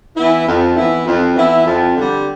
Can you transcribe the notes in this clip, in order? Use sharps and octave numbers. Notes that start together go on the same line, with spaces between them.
E3 B3 E4
F2
E3 B3 E4
F2
E3 B3 E4
F2
D3 G3